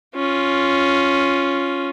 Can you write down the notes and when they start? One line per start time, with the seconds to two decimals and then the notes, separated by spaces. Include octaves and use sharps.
0.16 C#4 F4